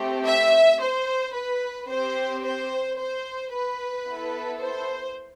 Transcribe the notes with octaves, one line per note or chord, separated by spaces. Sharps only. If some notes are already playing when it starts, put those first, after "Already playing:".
Already playing: A3 C4 G4
E5
C5
B4
C4 G4 C5
C5
C5
B4
B3 E4 A4
C5